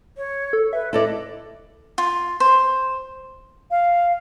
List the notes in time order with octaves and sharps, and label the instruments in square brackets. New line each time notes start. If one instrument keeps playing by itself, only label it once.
[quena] C#5
[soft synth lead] A4
[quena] B4 [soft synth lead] E5
[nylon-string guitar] E4 A4 D5 [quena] D#5
[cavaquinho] F4
C5
[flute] F5